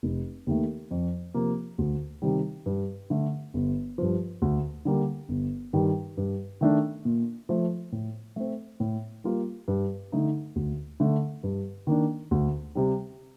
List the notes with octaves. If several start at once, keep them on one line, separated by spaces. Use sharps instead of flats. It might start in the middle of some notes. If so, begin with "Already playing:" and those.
F1
D#2 D#3 A3
F2
C3 F3 A#3
D2
C3 D#3 G3
G2
D3 A3
G1
G2 F3
D2
D3 G3 A#3
G1
G2 D#3 G3
G2
D#3 A3 D4
A#2
F3 A3
A2
A3 C4
A2
G3 A#3 F4
G2
D3 A3 D#4
D2
D3 A3
G2
D#3 A#3 D4
D2
C3 G3